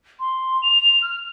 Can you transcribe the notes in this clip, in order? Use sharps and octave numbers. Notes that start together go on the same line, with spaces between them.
C6
F7
F6